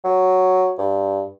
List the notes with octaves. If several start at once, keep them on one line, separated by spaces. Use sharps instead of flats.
F#3
G2